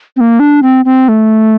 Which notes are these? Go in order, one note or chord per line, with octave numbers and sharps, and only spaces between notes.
C4
A#3
D4
C4
C4
A3